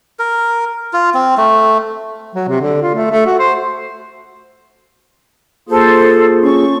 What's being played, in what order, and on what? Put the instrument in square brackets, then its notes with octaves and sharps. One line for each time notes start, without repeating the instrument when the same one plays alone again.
[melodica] A#4
F4
C4
A3
[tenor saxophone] F#3
C3
D3
F4
A3
A3
F#4
C5
[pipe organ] A#3 F4 G#4 [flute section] A4 C5
[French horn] C#4 [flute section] C#6